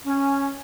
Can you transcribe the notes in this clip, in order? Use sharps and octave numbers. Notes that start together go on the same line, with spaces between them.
C#4